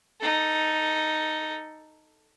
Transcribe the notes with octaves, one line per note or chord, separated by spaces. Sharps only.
D#4 A4